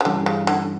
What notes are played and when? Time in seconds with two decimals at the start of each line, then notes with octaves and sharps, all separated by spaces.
0.01 C#3
0.05 G2 D3 E3 G3 C#4
0.26 C#3
0.47 D3